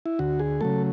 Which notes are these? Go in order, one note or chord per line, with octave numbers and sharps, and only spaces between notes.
E4
D2 F#4
G#4
C#3 F#3 A3 A4